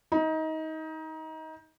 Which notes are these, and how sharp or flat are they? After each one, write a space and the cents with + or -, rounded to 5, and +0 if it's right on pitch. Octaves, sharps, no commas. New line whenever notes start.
D#4 +25